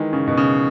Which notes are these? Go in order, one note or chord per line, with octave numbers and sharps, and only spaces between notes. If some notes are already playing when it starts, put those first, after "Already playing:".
Already playing: D#3 E3 G#3
C#3
B2
C#3